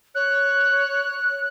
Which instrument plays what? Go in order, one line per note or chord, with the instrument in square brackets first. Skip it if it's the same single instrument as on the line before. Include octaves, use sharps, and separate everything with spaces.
[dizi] C#5 [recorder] F#6